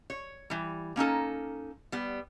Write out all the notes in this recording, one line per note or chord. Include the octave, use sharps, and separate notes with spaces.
C#5
E3 G3
A#3 C#4 D#4 A4
G3 B3